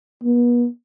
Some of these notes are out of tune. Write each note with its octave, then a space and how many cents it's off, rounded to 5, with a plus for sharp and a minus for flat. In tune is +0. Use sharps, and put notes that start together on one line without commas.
B3 -40